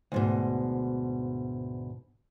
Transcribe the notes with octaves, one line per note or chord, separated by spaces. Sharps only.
D2 G#2 B2